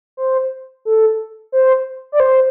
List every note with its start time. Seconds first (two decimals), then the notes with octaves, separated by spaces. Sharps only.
0.17 C5
0.85 A4
1.52 C5
2.12 D5
2.20 C5